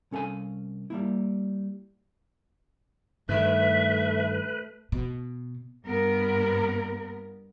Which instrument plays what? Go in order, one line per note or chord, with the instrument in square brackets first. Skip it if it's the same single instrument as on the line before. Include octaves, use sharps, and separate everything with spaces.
[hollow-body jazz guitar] C2 C#4 A4 F5 G#5
G3 A#3 E4
[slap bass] G2 D#3 [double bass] A3 [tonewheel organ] B4 [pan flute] E5
[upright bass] B2
[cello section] G2 B3 A#4